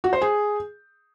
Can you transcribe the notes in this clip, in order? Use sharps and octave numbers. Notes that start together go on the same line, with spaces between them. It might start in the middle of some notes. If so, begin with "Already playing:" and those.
F#4
C5
G#4